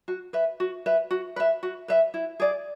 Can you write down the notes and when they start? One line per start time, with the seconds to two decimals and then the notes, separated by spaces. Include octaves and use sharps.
0.08 F#4
0.33 B4 E5
0.60 F#4
0.86 B4 E5
1.11 F#4
1.36 B4 E5
1.63 F#4
1.88 B4 E5
2.14 E4
2.40 G#4 D5